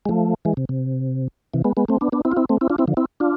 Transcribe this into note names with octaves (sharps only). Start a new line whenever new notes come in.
G#3
F3 A3
E3 G#3
C3
C3
C3 E3
G#3 B3
G#3 B3
A3 C4
B3 D4
B3 D4
C4 E4
F4
C4 E4
A3 C4
C4 E4
D4 F4
C4 E4
D3 F3
C4 E4
D4 F4